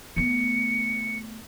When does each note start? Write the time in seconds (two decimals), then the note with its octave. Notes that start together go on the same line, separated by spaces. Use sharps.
0.16 A3 B3 C#7